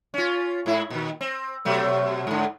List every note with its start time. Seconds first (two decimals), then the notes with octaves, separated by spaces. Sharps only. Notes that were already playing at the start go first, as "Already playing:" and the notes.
0.14 C#4 F4
0.66 G#2 E4
0.90 A#2 D#3
1.21 C4
1.65 B2 F#3 A3
2.27 G#2 D3